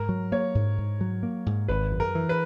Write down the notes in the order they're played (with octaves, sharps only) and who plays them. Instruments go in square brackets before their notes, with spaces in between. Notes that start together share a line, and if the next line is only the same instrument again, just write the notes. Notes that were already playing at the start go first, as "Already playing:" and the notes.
Already playing: [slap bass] G#2 [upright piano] A#4
[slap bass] F#3
[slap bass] A#3 [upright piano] C#5
[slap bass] G#2
G#2
F#3
A#3
G#2
[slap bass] G#1 [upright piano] B4
[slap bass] F#2
[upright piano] A#4
[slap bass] E3
[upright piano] B4